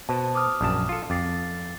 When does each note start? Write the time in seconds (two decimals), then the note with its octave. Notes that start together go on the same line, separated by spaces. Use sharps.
0.09 B2 C5 A5
0.35 D6 D#6 F6
0.61 A#1 F#2 A5
0.89 F4 A4
1.10 F2 D6 A6 C7